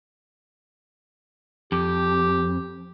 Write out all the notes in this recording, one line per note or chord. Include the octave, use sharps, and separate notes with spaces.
F2 G4